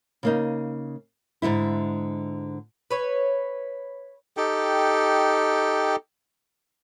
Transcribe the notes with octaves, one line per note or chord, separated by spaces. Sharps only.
C#3 A#3 D#4
G#2 D3 G#3 E4
B4 C#5
D#4 G4 A4 G5